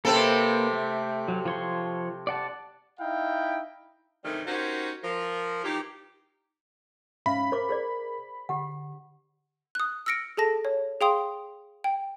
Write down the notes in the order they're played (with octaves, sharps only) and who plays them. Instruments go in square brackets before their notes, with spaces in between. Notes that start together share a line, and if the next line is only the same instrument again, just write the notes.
[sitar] C3 C4 A4 [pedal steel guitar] A#3 B4
[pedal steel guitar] A3
F#3
F3 C#5 C6
D5 F#5 A5
[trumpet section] D#4 E4 F5 G5
[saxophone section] G2 C3 D#3 E3 G3 A3
C#4 D#4 F#4 G4 A#4 C5
F3 A#4
E3 D#4 F4 G4
[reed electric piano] G#2 C#4 F5 [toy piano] E5 [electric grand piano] B5
[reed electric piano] A#4 [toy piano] C5 D6
[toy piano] G#4 C5 D5
[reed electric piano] D3 [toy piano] G4 F#5
[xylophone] D#6 F#6
E6 F6 A#6 C#7 D7
G#4 A4 A5 A#6
C#5
G#4 F5 G5 C6 D#6
G5